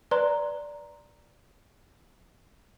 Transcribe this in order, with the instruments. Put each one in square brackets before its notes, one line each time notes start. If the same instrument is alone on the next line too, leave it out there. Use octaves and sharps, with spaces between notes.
[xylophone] B4 D5 A#5 C6 F#6